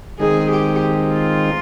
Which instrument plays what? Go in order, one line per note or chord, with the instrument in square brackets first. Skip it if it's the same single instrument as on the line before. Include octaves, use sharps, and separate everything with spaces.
[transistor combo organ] D#3 G#3 C4 D#4 [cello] G#4
[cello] G4
F4